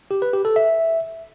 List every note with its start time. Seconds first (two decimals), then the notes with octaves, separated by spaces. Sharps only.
0.11 G4
0.22 B4
0.33 G4
0.45 A4
0.56 E5